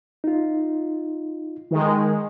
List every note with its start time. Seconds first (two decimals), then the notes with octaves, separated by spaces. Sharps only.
0.24 D#4 F4
1.71 D#3 G#3